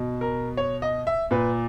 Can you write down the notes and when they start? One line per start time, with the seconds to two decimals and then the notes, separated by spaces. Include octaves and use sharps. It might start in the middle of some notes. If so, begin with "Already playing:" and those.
Already playing: B2
0.21 A#4
0.57 C#5
0.82 D#5
1.07 E5
1.31 A#2 B4